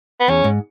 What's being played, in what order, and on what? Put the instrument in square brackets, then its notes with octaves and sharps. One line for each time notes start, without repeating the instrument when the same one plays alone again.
[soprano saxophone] B3
[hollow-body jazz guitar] E2 [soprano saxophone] C#4
[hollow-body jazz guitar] G#2